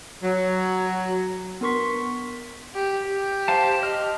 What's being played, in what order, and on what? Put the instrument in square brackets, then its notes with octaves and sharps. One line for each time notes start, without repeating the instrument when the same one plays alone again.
[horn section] F#3
[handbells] B3 D4 A#4 C6 C#6 B6
B6
[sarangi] G4
G4
[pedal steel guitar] C5 F5 A5
D#5 F6